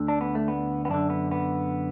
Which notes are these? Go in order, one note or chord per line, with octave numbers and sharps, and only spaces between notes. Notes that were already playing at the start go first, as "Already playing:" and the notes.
Already playing: D2 D3
D4
B3
A3
B3
B3
F#2 D3 D4
B3
B3